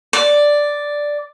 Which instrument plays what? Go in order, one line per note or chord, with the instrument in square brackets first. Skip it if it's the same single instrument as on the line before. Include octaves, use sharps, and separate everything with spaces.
[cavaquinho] D5